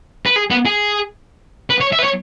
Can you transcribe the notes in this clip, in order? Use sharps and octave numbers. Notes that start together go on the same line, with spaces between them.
B4
G#4
B3
G#4
B4
C#5
E5
B4
C#5